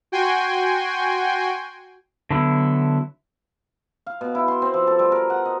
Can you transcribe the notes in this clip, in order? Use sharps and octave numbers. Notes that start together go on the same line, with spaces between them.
F#4 G5 G#5 C6
D3 F#3 B3 E4 A4
F5
B2
E4
C6
C4
F3
A4
G3
A#4
F#5
D#5